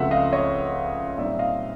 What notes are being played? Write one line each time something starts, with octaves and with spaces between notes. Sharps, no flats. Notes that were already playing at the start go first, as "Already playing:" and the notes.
Already playing: C#2 C#3 F3 A3 C4 E5 F#5
D#5 F5
C#5 D#5
A#2 G3 C4 D#4 D5 E5
D#5 F5